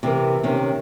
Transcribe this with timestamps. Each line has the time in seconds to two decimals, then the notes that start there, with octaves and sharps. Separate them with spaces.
0.03 C3 E3 C4 A#4
0.43 C3 D#3 C#4